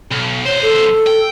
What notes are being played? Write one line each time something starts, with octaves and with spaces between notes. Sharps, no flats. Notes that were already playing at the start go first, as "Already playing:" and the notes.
B1
B1 C5 C#5
A4
G5